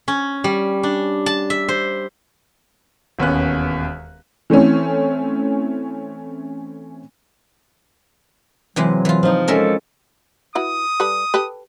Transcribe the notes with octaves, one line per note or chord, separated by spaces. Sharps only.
C#4
G3
D4
A5
E5
C5
E1 D#2 B3 C#4 F#6
E3 A3 C4 C#4
C3 E3 F#3 G#3
E3 F4
F3 D#4
G#3 C#4 A4 A#4 E5
E4 F#4 B4 D#6
G3 A4 B4
G4 A4 B4